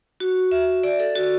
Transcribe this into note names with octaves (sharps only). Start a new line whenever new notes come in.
F#4
E5
D5
A4
F#4